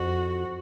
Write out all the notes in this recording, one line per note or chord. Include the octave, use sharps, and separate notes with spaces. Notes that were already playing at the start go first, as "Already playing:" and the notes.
Already playing: F2 F#4